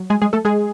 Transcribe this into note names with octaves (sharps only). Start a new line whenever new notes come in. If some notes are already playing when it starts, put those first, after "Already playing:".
Already playing: F#3
G#3 G#4
G#3 G#4
A3 A4
G#3 G#4